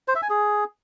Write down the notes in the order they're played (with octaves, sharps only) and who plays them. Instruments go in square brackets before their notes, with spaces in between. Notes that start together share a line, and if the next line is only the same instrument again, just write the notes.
[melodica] C5
E5
G#5
G#4